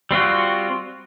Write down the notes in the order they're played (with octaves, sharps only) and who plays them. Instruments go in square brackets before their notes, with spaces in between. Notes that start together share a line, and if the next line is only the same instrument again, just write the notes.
[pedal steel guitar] G3 C4 F4 F#4